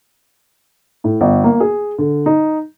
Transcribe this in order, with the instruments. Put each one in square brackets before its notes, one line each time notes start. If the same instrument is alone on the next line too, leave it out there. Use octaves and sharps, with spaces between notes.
[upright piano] A2
G1
A#3
G#4
D3
D#4